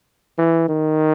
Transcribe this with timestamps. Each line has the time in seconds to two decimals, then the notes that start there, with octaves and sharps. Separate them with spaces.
0.39 E3
0.69 D#3